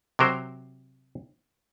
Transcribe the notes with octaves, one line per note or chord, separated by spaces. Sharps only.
C3 F#3 A#4 C5